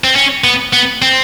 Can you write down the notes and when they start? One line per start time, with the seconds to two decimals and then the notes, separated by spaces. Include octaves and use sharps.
0.04 C4
0.16 C#4
0.44 B3
0.73 B3
1.02 C4